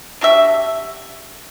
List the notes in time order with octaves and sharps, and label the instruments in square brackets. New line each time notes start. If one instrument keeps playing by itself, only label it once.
[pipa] D4 F#4 G4 E5